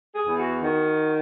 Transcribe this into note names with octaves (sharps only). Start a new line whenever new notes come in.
G#4
E2
F#4
D#3 F#4